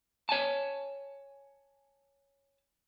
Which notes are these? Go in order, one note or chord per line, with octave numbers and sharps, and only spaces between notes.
C#5 G#5 A5